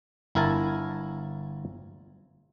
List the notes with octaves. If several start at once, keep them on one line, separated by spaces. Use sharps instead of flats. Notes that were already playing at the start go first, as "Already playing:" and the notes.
G1 E4 A#4 G#5 A5